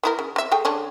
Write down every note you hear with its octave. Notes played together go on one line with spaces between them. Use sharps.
B3 E4 A#4
C#3
C4 E5
A3 G#4 G5
D3 C#4 D4